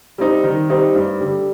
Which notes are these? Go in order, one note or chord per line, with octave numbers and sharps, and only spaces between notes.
G3 C4 D#4
D#3
G3 C4 D#4
G2
D3 G3